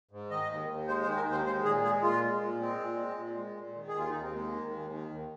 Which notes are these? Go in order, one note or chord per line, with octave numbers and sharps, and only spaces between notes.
G#2
D#3 D#5
D#2
D#2
G#3 C5
C5
D#3
A#4
D#2 C5
G#3 C5
A#2 G#4
G#3 G#4
A#2 F4
G#3
A#2
G#3 C4
A#2
G#3
A#2
G#3
A#2
D#3
G#4
D#2 F4
D#2 D#4
C4
G#3 A#3
D#3
D#2
D#3
D#2